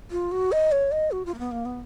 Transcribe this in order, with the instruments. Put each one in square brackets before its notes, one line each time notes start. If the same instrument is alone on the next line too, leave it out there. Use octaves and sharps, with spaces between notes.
[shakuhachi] F4
F#4
D#5
C#5
D#5
F#4
F4
A#3
B3
A#3
B3